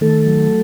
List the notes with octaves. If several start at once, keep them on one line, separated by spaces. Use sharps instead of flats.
D#3 A3 A4
F#3